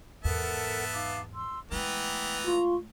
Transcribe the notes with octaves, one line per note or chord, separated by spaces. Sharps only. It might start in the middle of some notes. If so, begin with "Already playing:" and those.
E2 G#2 B3 A4 A#4 E5 F#5 A5
D#4 F5 D6
C6 E6
E3 G#3 A3 B3 G5 A#5
F4 C6 C#6